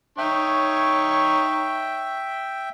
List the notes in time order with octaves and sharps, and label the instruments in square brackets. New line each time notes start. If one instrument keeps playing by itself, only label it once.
[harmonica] D#4 C#5 C#6 [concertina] E5 G5